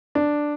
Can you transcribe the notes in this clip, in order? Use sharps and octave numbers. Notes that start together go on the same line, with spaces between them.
D4